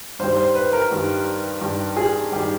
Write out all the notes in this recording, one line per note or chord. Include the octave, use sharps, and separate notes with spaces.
G2 D#3 G3 C5
C5
B4
A#4
G2 D#3 G3
G2 D#3 G3
G#4
G2 D#3 G3 G4